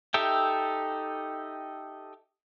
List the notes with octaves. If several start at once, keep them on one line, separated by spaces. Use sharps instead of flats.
D#4 G4 A4 E5 G5